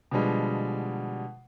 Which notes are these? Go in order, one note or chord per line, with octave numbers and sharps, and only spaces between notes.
B2 D3 F3 G3 G#3